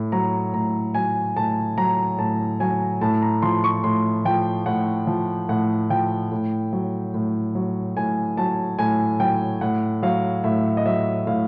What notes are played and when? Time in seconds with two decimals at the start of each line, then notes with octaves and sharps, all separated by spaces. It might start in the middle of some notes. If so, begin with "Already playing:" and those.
Already playing: A2
0.12 F#3 A#5
0.54 A2 A#5
0.94 F#3 G#5
1.37 A2 A5
1.78 F#3 A#5
2.19 A2 A5
2.60 F#3 G#5
3.01 A2 A5
3.22 A#5
3.42 F3 C6
3.64 C#6
3.84 A2 C6
4.25 F3 G5
4.66 A2 F#5
5.07 F3
5.49 A2 F#5
5.90 F3 G5
6.32 A2
6.73 F#3
7.14 A2
7.55 F#3
7.97 A2 G#5
8.37 F#3 A5
8.79 A2 G#5
9.20 F#3 G5
9.61 A2 F#5
10.03 F#3 F5
10.44 A2 E5
10.77 D#5
10.86 F#3 E5
11.27 A2 F5